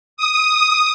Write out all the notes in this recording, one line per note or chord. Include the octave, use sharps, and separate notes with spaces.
D#6